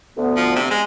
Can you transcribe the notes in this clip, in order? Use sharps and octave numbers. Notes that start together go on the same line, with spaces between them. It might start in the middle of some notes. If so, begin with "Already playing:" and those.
D2 B3
F3
C3
G#3